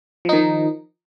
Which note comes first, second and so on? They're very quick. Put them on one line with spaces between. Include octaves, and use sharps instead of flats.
F3 D#4 D#3